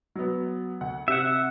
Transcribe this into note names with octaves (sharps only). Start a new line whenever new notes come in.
F#3 B3
D2 F#5
C3 E5 F#5